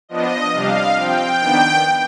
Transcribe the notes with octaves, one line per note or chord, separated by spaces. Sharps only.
F3 B3 D4 D#5
C3 G3 D4 F5
F3 C4 G5
D#3 B3 D4